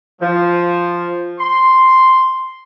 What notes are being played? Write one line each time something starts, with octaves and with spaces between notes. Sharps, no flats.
F3
C6